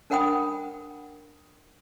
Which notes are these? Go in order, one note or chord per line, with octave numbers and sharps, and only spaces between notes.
D4 A#4 F#5 G5 B5 D#6